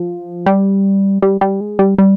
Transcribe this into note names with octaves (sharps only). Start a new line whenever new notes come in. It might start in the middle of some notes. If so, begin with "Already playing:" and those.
Already playing: F3
G3
G3
G3
G#3
G3
G3